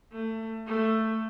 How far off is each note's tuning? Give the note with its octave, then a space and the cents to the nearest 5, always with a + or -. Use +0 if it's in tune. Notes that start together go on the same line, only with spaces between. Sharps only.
A3 +25
A3 +10